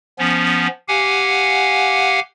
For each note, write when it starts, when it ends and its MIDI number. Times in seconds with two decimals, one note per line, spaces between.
0.19 0.67 53
0.19 0.67 59
0.19 0.67 61
0.88 2.20 67
0.88 2.20 77
0.88 2.20 78
0.88 2.20 80